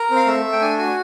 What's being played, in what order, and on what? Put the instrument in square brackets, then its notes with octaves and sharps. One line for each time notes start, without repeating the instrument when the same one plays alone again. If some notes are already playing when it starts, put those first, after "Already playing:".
Already playing: [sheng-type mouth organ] A#4
C4
F5
A3 E5
A3
G5
D4 G#5
F#4 G#5